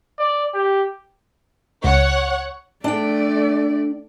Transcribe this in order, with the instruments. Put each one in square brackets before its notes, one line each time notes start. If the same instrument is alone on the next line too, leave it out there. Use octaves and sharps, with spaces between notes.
[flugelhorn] D5
G4
[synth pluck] C#2 [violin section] C#5 F#5
[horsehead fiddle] A3 D5 [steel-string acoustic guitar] D4 G5